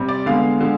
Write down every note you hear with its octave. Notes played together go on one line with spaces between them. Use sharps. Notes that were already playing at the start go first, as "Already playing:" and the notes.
Already playing: C3 G3 C4
D5
D3 G#3 B3 F5
D3 G#3